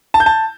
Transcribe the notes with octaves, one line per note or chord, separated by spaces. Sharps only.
A5
G6
A5